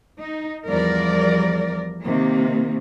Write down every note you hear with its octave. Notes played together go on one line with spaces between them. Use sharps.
D#4
E2 F3 G3 A#4 D5
C3 D#3 A#3